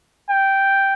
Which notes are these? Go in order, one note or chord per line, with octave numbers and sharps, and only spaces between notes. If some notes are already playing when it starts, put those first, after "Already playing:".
G5